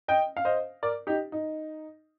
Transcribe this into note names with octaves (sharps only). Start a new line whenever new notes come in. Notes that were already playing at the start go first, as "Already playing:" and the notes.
D#5 G5
F5
C5 D#5
A#4 D5
D#4 G4
D#4